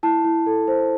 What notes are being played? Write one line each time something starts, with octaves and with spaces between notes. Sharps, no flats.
E4 A5
E4
A4
C5